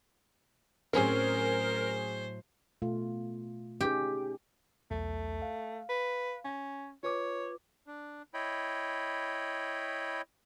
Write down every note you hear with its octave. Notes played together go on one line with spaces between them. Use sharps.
A2 F#3 C4 C#4 G#4 A#4 C5
B2 A3 F4
C#4 D#4 G4 G#4
B1 E2 A3
F5
B4
C#4
F4 B4 C#5 D6
D4
E4 C#5 D#5 G5 B5